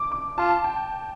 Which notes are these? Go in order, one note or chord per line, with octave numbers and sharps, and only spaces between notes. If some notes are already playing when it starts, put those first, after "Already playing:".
Already playing: D6
D6
F4 A5
G5